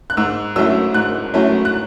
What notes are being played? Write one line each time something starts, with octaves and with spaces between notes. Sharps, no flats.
F#6
G#2 E6
F#3 A3 C#4 E4 E6
G#2 F#6
F#3 A3 C#4 E4
F#6